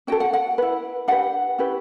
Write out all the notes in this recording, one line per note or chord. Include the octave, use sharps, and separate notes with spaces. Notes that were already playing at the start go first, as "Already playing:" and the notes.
C#4 F#4 A4 G5
F#5
F#5
E4 B4
D4 G4 B4 F#5
C#4 E4 G4 B4